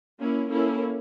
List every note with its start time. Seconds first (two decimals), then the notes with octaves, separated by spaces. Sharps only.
0.18 A#3 C#4 E4
0.49 A#3 C#4 E4 A4